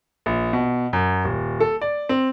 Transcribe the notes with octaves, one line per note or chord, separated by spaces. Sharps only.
A#1
B2
F#2
D#1
A4
D5
C4